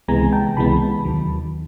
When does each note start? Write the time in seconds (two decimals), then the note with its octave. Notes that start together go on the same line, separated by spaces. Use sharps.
0.08 C#2 C3 E3 G#3 B3 G#5 A#5
0.33 G5 A5
0.57 C#2 C3 E3 G#3 B3 A5 B5
1.04 D#2 D#3 F#3